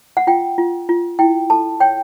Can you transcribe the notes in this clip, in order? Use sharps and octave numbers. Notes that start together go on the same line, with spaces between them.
F#5
F4 G5
F4
F4
E4 G5
A4 A5
C#5 G5